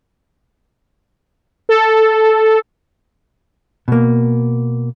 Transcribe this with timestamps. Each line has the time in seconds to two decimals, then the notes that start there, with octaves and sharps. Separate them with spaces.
1.69 A4
3.88 B2 A#3